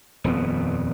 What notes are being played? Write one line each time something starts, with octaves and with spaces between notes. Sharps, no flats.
D#1 F2 B3